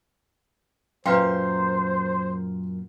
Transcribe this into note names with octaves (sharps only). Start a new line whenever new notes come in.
F#2 A#2 B4 C5 F5 G5 C6